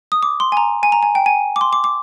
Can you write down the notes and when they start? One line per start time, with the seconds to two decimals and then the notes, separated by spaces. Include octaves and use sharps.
0.12 D#6
0.23 D6
0.40 C6
0.52 G#5
0.57 A#5
0.83 G#5
0.92 A#5
1.03 G#5
1.15 G5
1.26 G#5
1.56 D6
1.61 C6
1.73 D6
1.84 D6